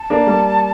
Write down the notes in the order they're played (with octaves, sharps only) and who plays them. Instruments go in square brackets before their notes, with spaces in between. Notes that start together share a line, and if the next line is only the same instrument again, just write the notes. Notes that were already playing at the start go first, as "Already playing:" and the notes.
Already playing: [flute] A5
[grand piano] A#3 D4
G3 A#3